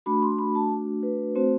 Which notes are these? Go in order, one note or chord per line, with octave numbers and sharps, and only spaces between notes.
A3 D4 F#4 B5
C6
B5
A5
B4
A3 C4 F#4 C5